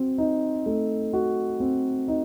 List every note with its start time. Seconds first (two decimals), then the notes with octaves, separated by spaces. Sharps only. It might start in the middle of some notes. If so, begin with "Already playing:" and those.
Already playing: C4 F#4
0.18 D#4
0.66 A3
1.13 F#4
1.60 C4
2.08 D#4